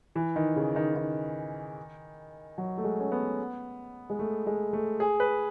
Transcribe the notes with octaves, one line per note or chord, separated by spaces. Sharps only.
E3
D#3
C#3
D#3
D#3
F#3
A3
G#3
C#4
B3
G#3
A3
G#3
A3
G#4
B4